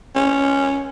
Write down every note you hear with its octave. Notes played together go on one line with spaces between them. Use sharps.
C#4